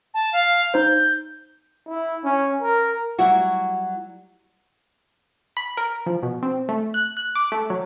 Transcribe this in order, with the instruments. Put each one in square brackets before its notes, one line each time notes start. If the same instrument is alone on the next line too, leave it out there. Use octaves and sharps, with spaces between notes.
[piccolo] A5
F5
[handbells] D#4 C5 [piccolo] G6
[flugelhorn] E4
C#4
A#4
[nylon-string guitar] F#3 G3 E4 F#4
[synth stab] B5
A#4
F3
B2
C4
A3
F#6
F#6
D6
A3
F#3